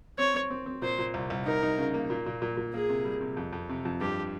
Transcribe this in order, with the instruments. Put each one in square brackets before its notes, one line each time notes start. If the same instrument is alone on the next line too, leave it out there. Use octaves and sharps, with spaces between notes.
[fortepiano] C4 [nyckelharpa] C#5
[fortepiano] C4
C4
C4
[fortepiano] A#2 [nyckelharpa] C5
[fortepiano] A#2
C2
C2
[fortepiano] D#4 [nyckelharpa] A#4
[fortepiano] D#4
C#3
A#3
A#2
A#2
A#2
A#2
[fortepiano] A#3 [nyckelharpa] G#4
[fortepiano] C3
G3
C3
F2
F2
C3
F2
[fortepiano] G2 [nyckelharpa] G4